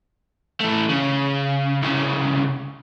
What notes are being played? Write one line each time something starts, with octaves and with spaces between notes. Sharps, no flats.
E3 A3
C#3
C2 C#3